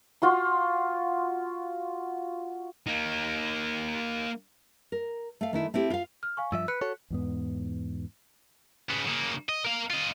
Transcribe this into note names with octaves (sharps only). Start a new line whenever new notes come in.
F4 F#4 C6
A#3 D#4
A#4
A3 F5
D#3 A3 E4
A3 C4 E4 G4
F4 F5
F6
F5 G#5 C#6
G2 F3 E5 E6
B4 F#6 B6 C#7
F#4 A4 C#5
E2 G#2 B3
C#3 B3
C#3 A#3
D#5
A#4 F5
F4 D#5